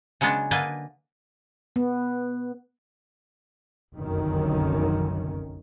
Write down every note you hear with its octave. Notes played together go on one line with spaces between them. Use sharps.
C#3 F#3 G#3 B3 D4
D3 A#3 B4 D5 D#5 G#5
B3
F1 B1 F#2 D3 D#3 C#4